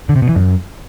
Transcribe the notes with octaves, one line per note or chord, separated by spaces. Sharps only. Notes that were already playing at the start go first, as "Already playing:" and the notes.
D3
C3
B2
E3
F#2